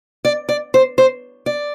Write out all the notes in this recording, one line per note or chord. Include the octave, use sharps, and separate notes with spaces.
D5
D5
C5
C5
D5